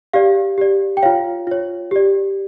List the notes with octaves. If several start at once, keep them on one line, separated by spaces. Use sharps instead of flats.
G4 D5 F5
G4 D5
G5
F4 C#5 F5
F4 C#5
G4 D5